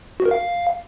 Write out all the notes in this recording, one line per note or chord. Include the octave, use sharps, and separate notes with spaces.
F#4
A#4
F5